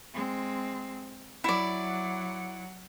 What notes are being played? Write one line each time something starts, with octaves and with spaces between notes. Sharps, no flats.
G#3 C4
F#3 E4 D5 F#5